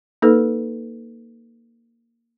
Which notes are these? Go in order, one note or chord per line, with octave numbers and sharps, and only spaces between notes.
A#3 D#4 A4 B4